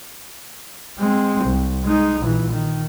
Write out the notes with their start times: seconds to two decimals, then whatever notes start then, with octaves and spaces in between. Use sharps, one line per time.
0.99 G#3 C4
1.44 C2
1.84 G#3 D#4
2.21 A#1 E3
2.51 D#3